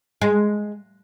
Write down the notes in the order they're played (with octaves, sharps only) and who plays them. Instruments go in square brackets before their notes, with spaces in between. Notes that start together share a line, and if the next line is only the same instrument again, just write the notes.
[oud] G#3